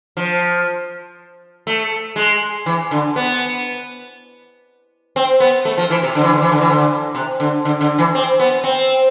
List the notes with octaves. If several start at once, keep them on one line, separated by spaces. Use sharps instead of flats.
F3
A3
G#3
E3
D3
B3
C4
B3
A3
F3
E3
C3
D3
E3
D3
E3
D3
E3
D3
C3
D3
D3
D3
E3
C4
B3
C4